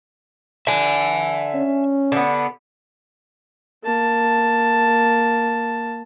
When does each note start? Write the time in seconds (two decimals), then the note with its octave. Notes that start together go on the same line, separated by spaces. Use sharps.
0.67 D3 E5 G#5
1.55 C#4
2.12 D3 B3
3.84 A#3 A5